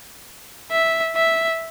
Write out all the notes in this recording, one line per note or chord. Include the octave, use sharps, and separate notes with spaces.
E5
E5